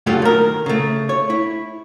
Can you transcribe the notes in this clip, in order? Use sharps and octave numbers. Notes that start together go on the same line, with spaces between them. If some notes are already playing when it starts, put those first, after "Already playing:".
G2 C#3 F#3 G3 A3 F4
D#3 A#4
C#3 A3
C#5
E4